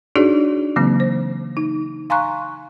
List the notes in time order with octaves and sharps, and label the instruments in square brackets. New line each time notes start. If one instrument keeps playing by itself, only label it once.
[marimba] D4 D#4 F#4 G#4 C#5 D5
C#3 E3 F#3 A#3 C4
C5
D#4
F5 G#5 A#5 C6 C#6 F#6